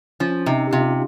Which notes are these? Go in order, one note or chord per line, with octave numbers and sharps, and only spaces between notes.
F3 C#4
C3 D#4
G4
C3 F4